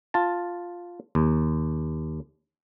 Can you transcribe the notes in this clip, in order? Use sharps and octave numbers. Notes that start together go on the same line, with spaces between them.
F4 A5
D#2